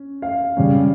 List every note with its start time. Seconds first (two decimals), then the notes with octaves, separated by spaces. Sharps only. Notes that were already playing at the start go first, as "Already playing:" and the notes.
Already playing: C#4
0.22 F5
0.57 C#3 G3 C#4